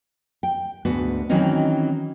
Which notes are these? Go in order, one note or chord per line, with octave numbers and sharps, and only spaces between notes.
G5
D2 G#2 B3 F#4
D#3 E3 F#3 C4 C#4 D#4